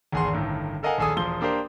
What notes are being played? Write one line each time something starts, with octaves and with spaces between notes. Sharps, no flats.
G#1 E2 G#4 F#5 C6
G1 A2 D#3
A4 A#4 D#5 F5 F#5 G#5
A#1 D#2 G#4 A4 G#5 D#6
E1 F3 C6 G7
A#3 D4 G4 A#4 C5